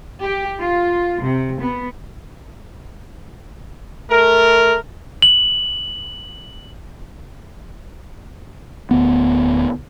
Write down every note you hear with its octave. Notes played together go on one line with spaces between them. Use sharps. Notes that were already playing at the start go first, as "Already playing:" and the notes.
G4
F4
C3
B3
A3 A#4
F#7
D1 D2 B3